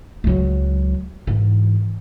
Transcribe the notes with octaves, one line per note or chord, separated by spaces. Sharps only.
C#2 F#3
G#2 E3